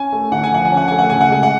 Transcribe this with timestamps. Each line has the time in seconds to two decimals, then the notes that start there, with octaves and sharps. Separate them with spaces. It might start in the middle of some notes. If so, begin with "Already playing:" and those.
Already playing: C#4 G#5
0.12 A3
0.32 D3 F#5
0.44 G#5
0.52 F3 F#5
0.65 G#5
0.72 C#4
0.77 F#5
0.88 A3 G#5
0.99 F#5
1.10 C#3 G#5
1.21 F#5
1.31 G#3 G#5
1.43 F#5